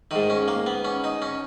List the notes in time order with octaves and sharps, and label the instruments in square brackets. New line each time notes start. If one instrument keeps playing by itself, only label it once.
[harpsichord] G#2 D#3 D#4
C#4
A#3
B3
C#4
D#4
C#4